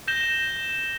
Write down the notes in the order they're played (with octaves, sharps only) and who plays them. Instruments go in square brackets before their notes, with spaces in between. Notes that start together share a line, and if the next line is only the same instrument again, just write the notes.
[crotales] G6 A#6 E7 G7